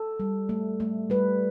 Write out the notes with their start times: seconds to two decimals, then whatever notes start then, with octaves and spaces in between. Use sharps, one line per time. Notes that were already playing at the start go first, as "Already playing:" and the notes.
Already playing: A4
0.20 G3
0.49 A3
0.80 A3
1.10 G3 B4